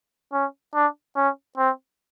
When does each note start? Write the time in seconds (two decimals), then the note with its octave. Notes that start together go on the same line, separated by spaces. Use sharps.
0.33 C#4
0.74 D4
1.16 C#4
1.57 C4